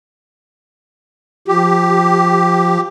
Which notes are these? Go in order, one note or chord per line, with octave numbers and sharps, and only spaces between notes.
F3 G4